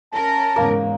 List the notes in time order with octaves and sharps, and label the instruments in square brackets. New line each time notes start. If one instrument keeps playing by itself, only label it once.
[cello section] C#4 A#4 [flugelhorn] A5
[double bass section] E2 G#2 C#3 [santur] A#3